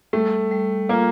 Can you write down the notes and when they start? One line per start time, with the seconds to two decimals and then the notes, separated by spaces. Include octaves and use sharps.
0.13 G3 A3
0.51 G3
0.89 A#3 F4